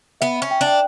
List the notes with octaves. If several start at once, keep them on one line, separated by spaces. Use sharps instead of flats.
B3 E5
E5
C#4
G5
D4
G5